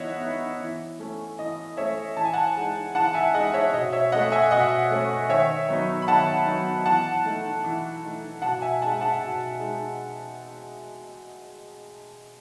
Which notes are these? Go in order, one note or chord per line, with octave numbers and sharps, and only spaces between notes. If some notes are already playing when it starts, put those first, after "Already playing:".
Already playing: E3 B3 D#4 C#5 D#5 E5 F#5
B3 D#4
E3
A3 C#4
E3 D#5
A3 C#4 C#5 E5
E3 A5
G#5
F#5 A5
G#3 D#4
E3 F#5 A5
E5 G#5
G#3 D#4 D#5 F#5
C#5 E5
B2 D#5
C#5 E5
A3 C#4 D#5 F#5
E5 G#5
B2 D#5 F#5
A3 C#4
D#3 C#5 E5
F#3 B3 D#4
B5
D#3 F#5 A5
F#3 B3 D#4
E3 F#5 A5
A3 D#4
E3
A3 D#4
B2 F#5 A5
E5 G#5
G#3 D#4 F#5 A5
F#5 A5
B2
G#3 D#4